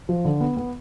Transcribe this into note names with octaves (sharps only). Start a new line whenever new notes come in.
F3
D3
B3
B3